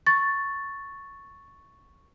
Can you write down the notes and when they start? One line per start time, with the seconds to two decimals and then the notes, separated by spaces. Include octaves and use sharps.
0.07 C#6 A6